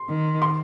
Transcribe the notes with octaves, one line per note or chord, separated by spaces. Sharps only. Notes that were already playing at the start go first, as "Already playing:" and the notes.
Already playing: C6
D#3
C6